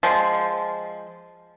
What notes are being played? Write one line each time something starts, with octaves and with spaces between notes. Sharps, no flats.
F3 G#3